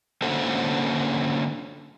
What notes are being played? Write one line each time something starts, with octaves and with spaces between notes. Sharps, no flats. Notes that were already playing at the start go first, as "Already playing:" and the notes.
D3 A#3 C#4 F#4 A4 C5